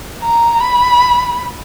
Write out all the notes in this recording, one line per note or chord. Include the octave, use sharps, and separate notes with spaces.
A#5
B5